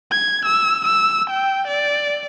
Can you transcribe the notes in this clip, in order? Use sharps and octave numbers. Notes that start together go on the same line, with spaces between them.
G#6
E6
E6
G5
D5